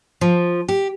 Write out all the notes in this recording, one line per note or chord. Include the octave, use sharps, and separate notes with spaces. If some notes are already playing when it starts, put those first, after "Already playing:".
F3
G4